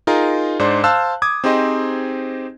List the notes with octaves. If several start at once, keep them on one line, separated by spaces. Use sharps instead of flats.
D#4 F4 G#4 A#4
G#2 D4 C5 D5
C5 F5 A5 E6 F#6
D6 D#6 G#6
C4 D#4 G4 G#4 C5 D#5